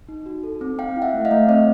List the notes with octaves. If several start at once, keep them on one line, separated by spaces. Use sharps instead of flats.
D#4
F#4
A4
C4
C4 F5 G5
E4
E5 F#5
A3
D#5 F5
A3
C4 C#5 D#5